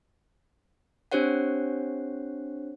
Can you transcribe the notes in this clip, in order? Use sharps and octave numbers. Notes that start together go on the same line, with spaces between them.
C4 D4 G4 C5 C#5 F#5